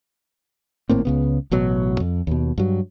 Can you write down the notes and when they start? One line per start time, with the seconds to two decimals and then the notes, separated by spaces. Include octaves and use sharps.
0.89 G#1 A2 A#3 C4
1.05 C#2 C#3 B3
1.51 A1 B2 F#3
2.00 F2
2.27 D#2 B2
2.58 G2 F#3